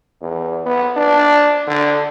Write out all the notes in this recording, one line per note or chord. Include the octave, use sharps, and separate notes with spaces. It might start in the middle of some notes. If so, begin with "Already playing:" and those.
E2
B3
D4
D3